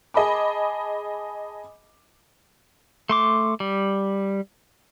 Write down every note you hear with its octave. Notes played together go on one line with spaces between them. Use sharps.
G#4 D#5 A5 B5 D6
A3 C6 D6
G3